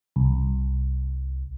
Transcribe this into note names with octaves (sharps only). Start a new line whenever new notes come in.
C2